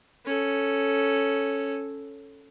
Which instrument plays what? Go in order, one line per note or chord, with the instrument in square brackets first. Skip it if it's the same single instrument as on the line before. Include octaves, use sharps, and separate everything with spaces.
[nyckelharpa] C#4 A4